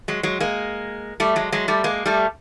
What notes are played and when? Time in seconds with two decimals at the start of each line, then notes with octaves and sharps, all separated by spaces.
0.08 F#3 G#3
0.23 F#3 G#3
0.40 G#3 A#3
1.20 G3 A3
1.36 F#3 G#3
1.52 F#3 G#3
1.68 G3 A3
1.84 G#3 A#3
2.06 G3 A3